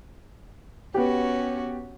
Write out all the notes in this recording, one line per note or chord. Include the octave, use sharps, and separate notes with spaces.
B3 C#4 F#4 G4